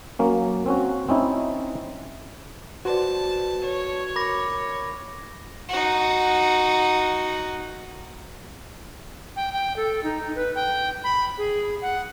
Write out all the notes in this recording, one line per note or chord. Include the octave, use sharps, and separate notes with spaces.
F#3 A#3 C#4
C4 C#4 F#4
C4 C#4 D#4 E4
F#4 B4 C5 D5 A5 C6
C#5
A#4 B5 D6 A#6
D#4 F#4
G5
G5
A4
D#4
B4
G5
B5
G#4
F#5